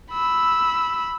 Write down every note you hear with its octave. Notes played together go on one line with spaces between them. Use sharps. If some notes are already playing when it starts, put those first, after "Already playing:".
B5 E6